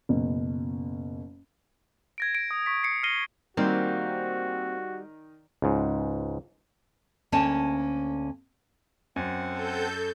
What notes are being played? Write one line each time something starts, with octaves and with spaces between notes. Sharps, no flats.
F#1 B2
G#6 A#6 D7
D7
D#6
C#6 B6
C7 C#7
F6 A#6 C7 D#7 G7
D#3 G3 A#3 C4 F#4
C#2 G#2
D2 A#3 C#4 C#5 A5
F#2 C4 F#5
A4 G6